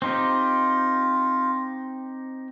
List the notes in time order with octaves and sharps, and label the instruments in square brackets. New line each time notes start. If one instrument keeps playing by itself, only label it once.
[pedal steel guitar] C4 D#4 G4 [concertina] F4